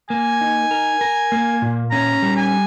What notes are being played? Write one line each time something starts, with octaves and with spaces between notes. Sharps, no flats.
A#3 G#5
D#4
A#4
A#4
A#3
A#2
C#4 A#5
G3
G#5